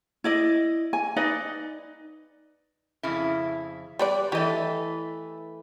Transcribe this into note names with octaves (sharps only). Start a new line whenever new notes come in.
E4 D5 D#5
G#5
D#4 B4 D5 D#5
F2 C#3 E4
G3 B4 D5
E3 A3 G4 D#5